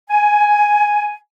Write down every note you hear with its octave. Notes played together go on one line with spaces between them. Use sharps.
G#5